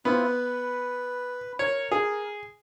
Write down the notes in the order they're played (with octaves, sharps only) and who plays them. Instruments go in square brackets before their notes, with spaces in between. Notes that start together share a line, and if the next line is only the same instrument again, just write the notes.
[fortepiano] B3 [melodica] C4 E4 F4
[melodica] B4
[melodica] A#4 [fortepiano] C#5
[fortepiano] G#4